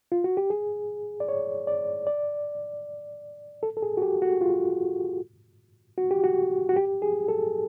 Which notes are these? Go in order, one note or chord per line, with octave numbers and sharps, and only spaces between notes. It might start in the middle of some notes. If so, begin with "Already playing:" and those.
F4
F#4
G4
G#4
D5
C#5
D5
D5
A4
A4
G#4
F#4
G4
F#4
F4
F#4
G4
F#4
F#4
G4
G#4
A4